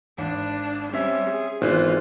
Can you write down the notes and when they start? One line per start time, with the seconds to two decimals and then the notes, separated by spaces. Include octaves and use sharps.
0.18 G#1 D4
0.93 G3 C4 C#4 E5
1.30 G#4
1.62 G#1 E3 G#3 B3 C4 F4